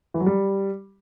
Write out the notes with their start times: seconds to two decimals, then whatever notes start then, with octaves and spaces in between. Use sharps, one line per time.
0.14 E3
0.20 F#3
0.26 G3